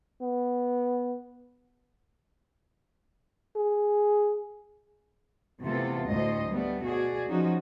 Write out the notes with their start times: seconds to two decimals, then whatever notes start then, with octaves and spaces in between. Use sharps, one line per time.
0.23 B3
3.56 G#4
5.63 C3 E3 A3 B3 F4 A4
6.09 D2 A2 A3 C5 D#5
6.51 G3 A3 B3
6.83 B2 F#4 G#4 D5
7.29 F3 C#4 D#4 F#4